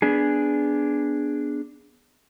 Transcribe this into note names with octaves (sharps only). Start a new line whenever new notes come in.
B3 D4 G#4